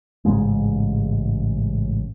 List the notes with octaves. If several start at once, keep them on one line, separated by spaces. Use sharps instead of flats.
A1 G#2 C#3 G#3